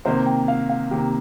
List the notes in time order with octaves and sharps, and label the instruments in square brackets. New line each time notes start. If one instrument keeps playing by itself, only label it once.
[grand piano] C3 D#3 A#3 [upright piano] C5
[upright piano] G5
F5
F5
[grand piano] C3 D#3 A#3 [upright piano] G4